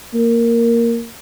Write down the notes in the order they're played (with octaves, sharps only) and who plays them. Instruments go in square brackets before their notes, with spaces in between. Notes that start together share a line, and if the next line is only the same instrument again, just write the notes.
[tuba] A#3